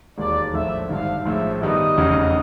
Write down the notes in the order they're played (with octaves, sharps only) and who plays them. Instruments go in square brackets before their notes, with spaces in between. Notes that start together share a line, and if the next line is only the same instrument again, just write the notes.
[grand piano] E1 D#2 D#3 G#3 [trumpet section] D5
[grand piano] A#1 A2 F3 A3 [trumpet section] E5
[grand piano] G#1 G2 D3 [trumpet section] F5
[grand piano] A#1 A2 F3 G#3 [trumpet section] E5
[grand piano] G2 D#3 G3 B3 [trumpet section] D#5
[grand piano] F1 E2 C#3 E3